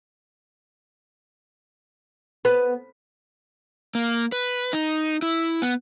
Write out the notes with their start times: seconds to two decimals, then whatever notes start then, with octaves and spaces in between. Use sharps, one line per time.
2.45 B3
3.95 A#3
4.32 B4
4.73 D#4
5.22 E4
5.62 B3